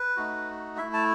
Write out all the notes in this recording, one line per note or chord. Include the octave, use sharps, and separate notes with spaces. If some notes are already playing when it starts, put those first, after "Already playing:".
Already playing: B4
A3 D#4 F#4
A3 E4 E5
A5